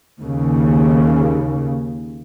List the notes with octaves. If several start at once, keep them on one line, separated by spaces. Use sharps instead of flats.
D#2 C#3